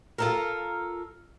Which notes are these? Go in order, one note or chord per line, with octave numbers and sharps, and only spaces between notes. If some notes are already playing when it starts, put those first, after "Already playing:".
F4 A4 A#4